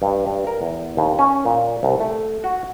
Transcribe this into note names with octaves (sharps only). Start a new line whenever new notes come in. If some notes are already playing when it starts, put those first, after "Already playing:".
G2
G2
A#4
E2
D#2
C#4
A#2
C2
A3
F#4